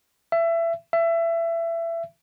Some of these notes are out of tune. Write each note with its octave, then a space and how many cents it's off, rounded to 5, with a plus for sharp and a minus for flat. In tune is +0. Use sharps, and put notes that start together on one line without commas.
E5 +25
E5 +25